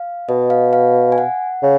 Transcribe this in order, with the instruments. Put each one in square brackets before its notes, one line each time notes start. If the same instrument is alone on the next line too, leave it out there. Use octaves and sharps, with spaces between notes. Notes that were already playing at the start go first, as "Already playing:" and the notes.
Already playing: [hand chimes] F5
[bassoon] B2 [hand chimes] D#5
[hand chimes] F5
F5
G#5
F#5
[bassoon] C#3